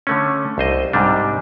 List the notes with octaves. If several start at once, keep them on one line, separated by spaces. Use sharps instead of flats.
D3 A3 C#4
C2 C5 D#5
G#2 C3 G3 D4